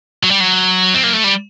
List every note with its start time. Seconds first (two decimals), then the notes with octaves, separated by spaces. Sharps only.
0.23 F#3
0.31 G3
0.40 F#3
0.94 C4
1.04 A#3
1.13 A3
1.24 G3